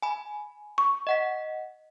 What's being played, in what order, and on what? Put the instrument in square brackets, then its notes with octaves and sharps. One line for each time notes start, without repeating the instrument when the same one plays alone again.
[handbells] G#5 B5
[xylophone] C#6
[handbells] D#5 F#5 B6